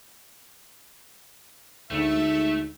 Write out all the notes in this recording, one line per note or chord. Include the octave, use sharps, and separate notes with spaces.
D2 G#2 A3 E5